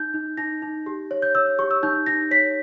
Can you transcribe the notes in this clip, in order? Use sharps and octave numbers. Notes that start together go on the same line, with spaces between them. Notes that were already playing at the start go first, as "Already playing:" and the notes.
Already playing: D#4 G6
D#4
D#4 A#6
D#4
G4
C#5
G6
C#5 E6
G4 C#6
E6
D#4 G6
D#4 A#6
C#5 B6